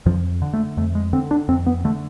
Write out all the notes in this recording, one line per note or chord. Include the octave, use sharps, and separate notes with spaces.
F2 F3
D3
A3
F2 A3
G#3
D3 C4
D4
F2 C4
B3
D3 A3